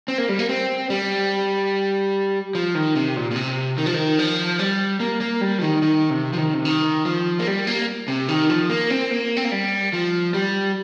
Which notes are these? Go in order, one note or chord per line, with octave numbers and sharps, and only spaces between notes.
C4
A#3
G3
A#3
C4
G3
F3
D#3
C3
A#2
A#2
C3
D#3
F3
D#3
F3
G3
A#3
A#3
G3
F3
D#3
D#3
C3
F3
D#3
C3
D#3
F3
A#3
G3
A#3
C3
D#3
F3
A#3
C4
A#3
C4
A#3
G3
F3
G3